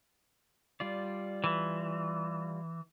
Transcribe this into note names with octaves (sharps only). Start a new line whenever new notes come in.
G3 F4 D5
E3